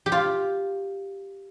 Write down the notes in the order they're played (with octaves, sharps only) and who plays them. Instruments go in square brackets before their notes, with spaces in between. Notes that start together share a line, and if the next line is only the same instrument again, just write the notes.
[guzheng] G4
F4